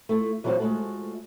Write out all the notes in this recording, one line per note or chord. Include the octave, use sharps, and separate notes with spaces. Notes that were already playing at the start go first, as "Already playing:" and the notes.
A3 E4 F4
E3 F#3 G3 C4 F4 F#4
G#3 A3 B3 F4 F#4 A4